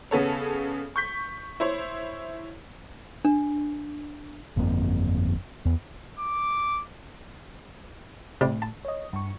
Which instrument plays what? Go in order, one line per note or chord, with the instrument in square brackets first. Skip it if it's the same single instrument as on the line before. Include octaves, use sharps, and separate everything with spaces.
[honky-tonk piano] C#3 B3 A4 C#5
C#6 G6 B6
E4 C5 C#5
[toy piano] D4
[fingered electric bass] G1 F2 A#3 C4
E2 B3
[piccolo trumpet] D6
[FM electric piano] A2 [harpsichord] C3 G3
[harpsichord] A5
[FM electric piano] C#5 D#5
G2 C#6